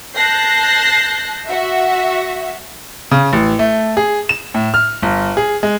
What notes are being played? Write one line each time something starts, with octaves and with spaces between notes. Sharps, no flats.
A5 F#6 G6 A#6 C7
F#4 E5
C#3
A1
A3
G#4
E7
A2
F6
G1
G#4
G#3